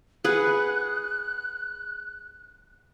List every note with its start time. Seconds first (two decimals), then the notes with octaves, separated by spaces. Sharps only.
0.24 G#4 B4 F#5 F#6